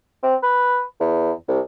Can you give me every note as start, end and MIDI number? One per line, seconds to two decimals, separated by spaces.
0.23 0.35 60
0.43 0.83 71
1.00 1.32 40
1.48 1.60 36